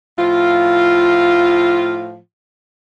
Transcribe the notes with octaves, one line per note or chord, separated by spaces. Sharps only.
A2 F3 F4